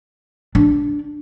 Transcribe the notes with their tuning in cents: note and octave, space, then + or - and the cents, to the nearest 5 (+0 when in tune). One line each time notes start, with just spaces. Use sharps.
D4 -5